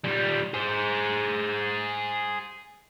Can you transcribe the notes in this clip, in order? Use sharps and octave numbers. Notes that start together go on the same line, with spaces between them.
A#2 G3
G#4 C5